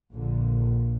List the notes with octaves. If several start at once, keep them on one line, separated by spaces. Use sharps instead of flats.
A#1 A#2 D3